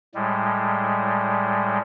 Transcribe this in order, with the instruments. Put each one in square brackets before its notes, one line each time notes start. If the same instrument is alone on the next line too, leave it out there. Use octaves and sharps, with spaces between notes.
[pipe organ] A2 G3 G#3